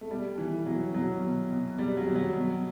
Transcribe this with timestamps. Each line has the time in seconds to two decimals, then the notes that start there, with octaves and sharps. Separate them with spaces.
0.01 A3
0.11 B2 G3
0.38 B2 E3
0.66 B2 F#3
0.94 B2 F#3
1.23 B2
1.51 B2
1.79 B2 G3
1.97 F#3
2.07 B2
2.15 F#3
2.34 B2